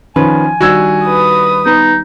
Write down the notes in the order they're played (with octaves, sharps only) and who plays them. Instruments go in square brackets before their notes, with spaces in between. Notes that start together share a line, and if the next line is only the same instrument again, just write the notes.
[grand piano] D#3 F3 C#4 [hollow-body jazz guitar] B4 [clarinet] G#5
[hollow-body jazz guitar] D#3 G3 D4 [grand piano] F#4 E6 G#6
[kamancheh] B4 D#6
[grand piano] B3 [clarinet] D#4